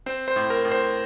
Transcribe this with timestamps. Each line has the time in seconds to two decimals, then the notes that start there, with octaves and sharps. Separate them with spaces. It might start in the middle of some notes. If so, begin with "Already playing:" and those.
0.06 C4 C5
0.28 C5
0.36 A2
0.50 A#4
0.65 A2
0.72 C5